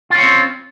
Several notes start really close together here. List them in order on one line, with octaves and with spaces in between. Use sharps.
F4 C#4 C#5 C4